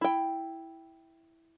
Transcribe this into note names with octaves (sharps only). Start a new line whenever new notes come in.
E4 G5